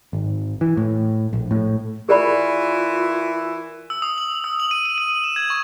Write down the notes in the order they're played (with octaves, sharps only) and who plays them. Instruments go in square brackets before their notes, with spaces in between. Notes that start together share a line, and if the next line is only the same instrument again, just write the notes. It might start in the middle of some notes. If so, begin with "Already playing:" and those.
[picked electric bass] G#1
E3
A2
A#1
A2
[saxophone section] E3 E4 [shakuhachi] F4 [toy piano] G#4 D5 B5 [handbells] A#4 C#6
[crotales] E6
D#6
F#7
E6
F#7
D#7
D#7
D#7
E7
G#6
C#6